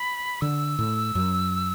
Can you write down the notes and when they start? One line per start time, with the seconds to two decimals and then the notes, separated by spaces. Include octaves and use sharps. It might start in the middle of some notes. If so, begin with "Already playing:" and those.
Already playing: B5
0.41 D3 E6
0.79 A2
1.15 F#2